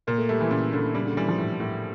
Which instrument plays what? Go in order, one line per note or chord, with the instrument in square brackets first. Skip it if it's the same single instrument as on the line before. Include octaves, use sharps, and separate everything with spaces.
[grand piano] A#2 [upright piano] A#3
[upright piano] A3
[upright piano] G3 [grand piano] A3
[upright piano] E3
[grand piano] A#2 [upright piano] C#3
[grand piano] A#2 [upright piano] D3
[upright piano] C#3 [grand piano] G3
[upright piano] D3
[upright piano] E3 [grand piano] G3
[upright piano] F3
[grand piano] A2
A2